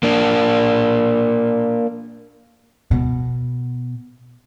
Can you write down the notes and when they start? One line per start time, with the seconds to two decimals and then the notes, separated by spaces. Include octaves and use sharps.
0.03 A#3 D4
2.91 B2